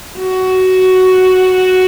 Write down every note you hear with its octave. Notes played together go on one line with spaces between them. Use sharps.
F#4